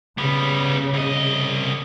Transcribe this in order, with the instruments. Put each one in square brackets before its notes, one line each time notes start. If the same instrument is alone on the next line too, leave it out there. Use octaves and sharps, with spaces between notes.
[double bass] C#3 [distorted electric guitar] G3 B3
[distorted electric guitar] C2 D#5